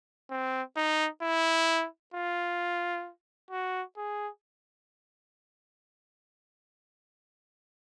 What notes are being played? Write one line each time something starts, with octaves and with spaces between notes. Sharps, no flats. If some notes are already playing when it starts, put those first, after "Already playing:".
C4
D#4
E4
F4
F#4
G#4